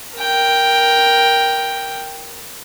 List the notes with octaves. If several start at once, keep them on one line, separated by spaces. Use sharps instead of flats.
A#4 G5